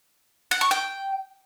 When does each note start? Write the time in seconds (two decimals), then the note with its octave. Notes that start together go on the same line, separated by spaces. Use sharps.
0.51 F#5
0.61 C#6
0.71 G5